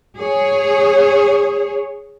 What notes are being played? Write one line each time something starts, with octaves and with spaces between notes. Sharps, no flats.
G#4 C#5